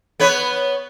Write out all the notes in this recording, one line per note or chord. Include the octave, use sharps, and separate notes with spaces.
B3 B4 C#5